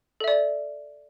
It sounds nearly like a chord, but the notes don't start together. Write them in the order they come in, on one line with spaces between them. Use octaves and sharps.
A4 E5 D5